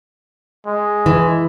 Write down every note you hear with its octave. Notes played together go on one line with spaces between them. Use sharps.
G#3
E3